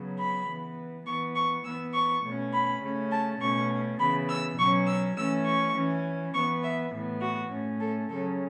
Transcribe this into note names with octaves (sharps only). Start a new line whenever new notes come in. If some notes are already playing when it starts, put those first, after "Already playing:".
Already playing: C#3 F#3 B3
B5
E3 B3
E3 B3 C#6
C#6
E3 B3 E6
C#6
B2 A3 C#4
B5
C#3 A3 C#4
A5
B2 A3 C#4 C#6
C#3 E3 B3 B5
E6
B2 F#3 C#4 C#6
E6
E3 A3 C#4 E6
C#6
E3 C#4
E3 B3 C#6
E5
A2 E3 B3
F#4
A2 A3 C#4
A4
C#3 F#3 C#4 A4